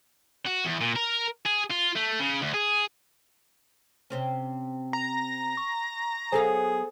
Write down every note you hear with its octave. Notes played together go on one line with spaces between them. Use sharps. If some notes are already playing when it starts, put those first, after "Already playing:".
F#4
E2
A#2
A#4
G#4
F4
A3
C#3
D2
G#4
C3 C4 C#4
A#5
C#6
F#3 B3 G#4 A4 C5 F5